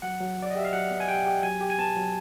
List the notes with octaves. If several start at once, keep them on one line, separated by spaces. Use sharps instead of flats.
F#3 F#5
F#3
F#3 D5
D#5
G4 E5
F5
F#3 F#5
B3
G#5
G4 G5
G4
F#3 G#5
G4
G#5
B3 A5
F#3